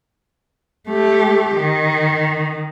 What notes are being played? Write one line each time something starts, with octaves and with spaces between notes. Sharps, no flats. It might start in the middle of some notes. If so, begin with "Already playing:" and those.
A3 G4
D#3